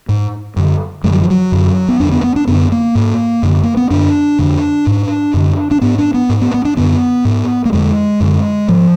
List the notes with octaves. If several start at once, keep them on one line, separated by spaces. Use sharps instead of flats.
G#2
F#2 D3
F#2 D3 G#3
F#3
F3
F#3
F#2 D3
B3
F2 D3 D4
B3
B3
D4
F#2 D3 B3
A#3
G#2
F#2 D3
A#3
B3
F#2 D3 D4
F2 D3
G#2
F#2 D3
D4
G#2 B3
D4
B3
G#2
B3
B3
D4
F#2 D3 B3
G#2
A#3
F2 D3 G#3
F#2 D3
G#2 F3